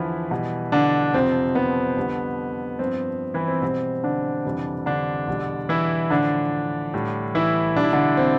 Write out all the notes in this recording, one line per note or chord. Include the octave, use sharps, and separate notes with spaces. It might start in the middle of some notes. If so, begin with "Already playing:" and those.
Already playing: E2 D3 E3 F3 E4
B2 G3
D3 D4
F2 C3 F3 C4
B3
F2 D3 G3
G2 F3 C4
E3 E4
C4
B2 G3 C4
D3 D4
F2 C3 E3 G3
D3 D4
E2 B2 G3
E3 E4
A2 D3 F3 D4
A2 G3
E3 E4
B2 G3 D4
E4
D3 D4
C4